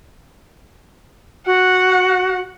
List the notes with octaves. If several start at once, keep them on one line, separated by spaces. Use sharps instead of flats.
F#4 F#5